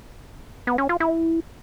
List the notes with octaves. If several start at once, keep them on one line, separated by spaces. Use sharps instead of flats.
B3
C#4
F4
E4